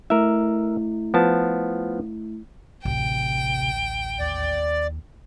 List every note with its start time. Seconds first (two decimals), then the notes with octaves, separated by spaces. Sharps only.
0.10 A3 E4 A#4 E5
1.14 F3 B3 A5
2.85 A1 D2 C3 G5
4.19 D#2 D5